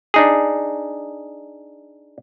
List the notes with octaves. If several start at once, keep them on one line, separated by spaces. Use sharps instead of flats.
D4 D#4 G#4